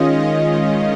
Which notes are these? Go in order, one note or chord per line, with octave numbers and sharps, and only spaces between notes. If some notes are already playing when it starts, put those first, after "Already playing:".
Already playing: D#3 G#3 C#4 F4 D#5
D#5